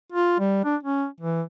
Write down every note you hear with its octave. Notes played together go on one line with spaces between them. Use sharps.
F4
G3
D4
C#4
E3